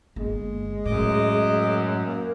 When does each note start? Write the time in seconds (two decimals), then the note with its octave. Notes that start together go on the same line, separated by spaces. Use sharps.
0.16 G1 G#3 A#3
0.86 F#2 A2 D#5 D6
2.05 A#3